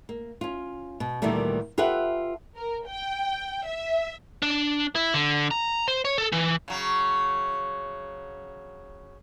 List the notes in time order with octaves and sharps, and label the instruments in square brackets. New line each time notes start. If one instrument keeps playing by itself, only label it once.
[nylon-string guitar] A#3
C#4 F4
B2
D2 A#2 D#3 E3 G3 A3
F4 G4 A4 B4 E5 F#5
[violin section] A#4
G5
E5
[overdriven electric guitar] D4
E4
D3
A#5
C5
C#5
A4
E3
[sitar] C#3 F#3